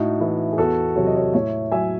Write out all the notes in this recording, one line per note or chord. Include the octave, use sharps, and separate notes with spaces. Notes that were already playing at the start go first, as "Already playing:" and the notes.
Already playing: A2 D#4 F#4
E3 E4
G#4
E2 F#4 A4
C3 F#3 C#5
D#5
A4 C#5
A2 C#5 E5
F#3 E5 G#5